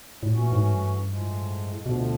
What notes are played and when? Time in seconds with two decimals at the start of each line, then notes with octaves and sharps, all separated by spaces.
0.23 A2
0.33 A#2 E3 A3 C#4 F#4
0.52 G#2
0.71 G2
1.10 A2 F3 G#3
1.86 D2 B2 D3 F3